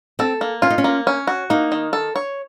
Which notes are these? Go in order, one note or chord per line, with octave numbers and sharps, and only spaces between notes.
C4 A4
A#3
C#4 F4
D#4
C#4
A#3
C#4
F#4
A#3 D#4
D#3
A4
C#5